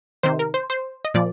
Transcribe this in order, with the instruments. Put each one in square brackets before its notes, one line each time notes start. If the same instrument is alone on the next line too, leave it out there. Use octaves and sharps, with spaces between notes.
[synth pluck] C3 D#3 C5
A#4
C5
C5
D#5
A#2 F3 D5